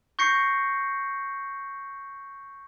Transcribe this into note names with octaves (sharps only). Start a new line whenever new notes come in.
C#6 G6 A#6 C7 C#7